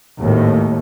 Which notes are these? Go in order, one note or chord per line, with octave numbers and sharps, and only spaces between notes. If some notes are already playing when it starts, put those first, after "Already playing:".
G#1 D#2 A2